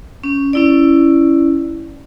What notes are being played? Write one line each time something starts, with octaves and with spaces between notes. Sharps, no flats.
C#4
C#4 E4 D5